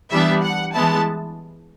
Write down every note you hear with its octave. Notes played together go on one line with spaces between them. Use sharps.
E3 G3 B3 D4 E5
F#5
E3 G#3 B3 E4 A5